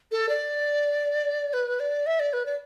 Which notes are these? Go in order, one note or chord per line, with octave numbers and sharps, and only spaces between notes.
A4
D5
B4
D5
E5
D5
B4
D5